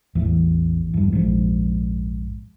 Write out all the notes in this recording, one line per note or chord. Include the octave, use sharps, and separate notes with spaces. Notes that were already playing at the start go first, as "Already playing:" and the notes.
A1 E2 A2
E2 G2
A#1 F2 G#2